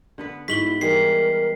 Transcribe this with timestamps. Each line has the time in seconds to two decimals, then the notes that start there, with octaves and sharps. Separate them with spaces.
0.18 D3 B3 B4
0.48 G#2 E4 F#4 B6 F#7 G7
0.81 E3 G3 G#3 A#4 C7